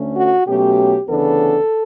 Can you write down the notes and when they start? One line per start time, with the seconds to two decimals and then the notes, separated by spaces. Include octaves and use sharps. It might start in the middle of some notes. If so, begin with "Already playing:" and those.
Already playing: D2 D3 A3 C#4
0.16 F#4
0.46 B2 F#3 A3 C#4 G4
1.08 D2 C#3 E3 B3 D4 A4